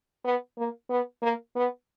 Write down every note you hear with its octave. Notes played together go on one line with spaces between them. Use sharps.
B3
A#3
B3
A#3
B3